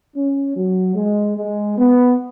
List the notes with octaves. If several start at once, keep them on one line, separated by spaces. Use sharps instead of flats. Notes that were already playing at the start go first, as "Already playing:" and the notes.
C#4
F#3
G#3
G#3
B3